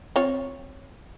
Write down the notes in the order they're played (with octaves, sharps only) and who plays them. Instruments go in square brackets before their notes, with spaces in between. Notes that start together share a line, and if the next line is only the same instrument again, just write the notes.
[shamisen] C4 F4 C#5